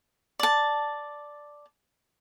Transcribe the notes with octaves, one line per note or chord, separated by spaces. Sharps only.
D5 A5